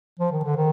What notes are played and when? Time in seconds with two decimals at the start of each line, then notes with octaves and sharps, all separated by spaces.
0.19 F3
0.32 D#3
0.44 D3
0.56 D#3